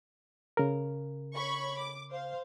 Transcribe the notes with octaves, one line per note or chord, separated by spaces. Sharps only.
C#3 A#4
C#5 B5 C#6
D6
C5 F5